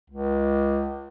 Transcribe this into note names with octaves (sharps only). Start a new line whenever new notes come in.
C#2